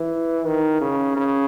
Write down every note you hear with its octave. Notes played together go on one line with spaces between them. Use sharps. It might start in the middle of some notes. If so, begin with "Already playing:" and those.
Already playing: E3
D#3
C#3
C#3